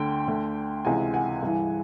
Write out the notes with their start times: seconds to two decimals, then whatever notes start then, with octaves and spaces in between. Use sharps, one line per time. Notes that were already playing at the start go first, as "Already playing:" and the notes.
Already playing: D2 D3 G5
0.28 D2 D3
0.85 C#2 C3 E3 F#5 G#5
1.14 F#5 G#5
1.43 G2 E3